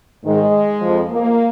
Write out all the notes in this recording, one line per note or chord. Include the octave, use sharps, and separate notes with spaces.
G#2 D#3 G#3
F2 F3
A#3